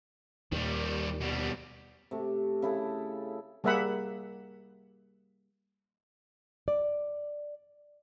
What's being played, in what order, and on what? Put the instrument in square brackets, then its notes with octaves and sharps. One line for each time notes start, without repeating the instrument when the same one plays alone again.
[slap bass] D#2 A#2 [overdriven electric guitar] D#3 G3
[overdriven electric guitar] B2 G3
[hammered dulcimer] C3 A3
C#3 E4 A4
[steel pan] G3 A#3 G#4 E5 F#5 B5
[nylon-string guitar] D5